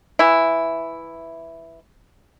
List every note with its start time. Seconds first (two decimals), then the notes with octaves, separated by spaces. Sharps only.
0.19 E3 E4